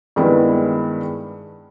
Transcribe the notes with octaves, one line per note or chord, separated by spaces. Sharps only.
G2 D#3 G#3 B3 E4